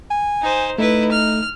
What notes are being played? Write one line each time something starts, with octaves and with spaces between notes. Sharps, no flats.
G#5
D#4 C5
A3 D#4 E4 B4
F6